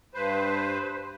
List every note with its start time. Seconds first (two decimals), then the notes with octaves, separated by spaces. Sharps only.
0.14 G2 B4 C5